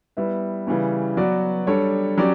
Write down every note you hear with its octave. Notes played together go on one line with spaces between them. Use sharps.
G3 B3 E4 B4 E5
C#3 E3 G3 C#4
F#3 B3 F#4 B4 D5
G3 D4 A4 C#5
F#3 C#4 G4 D5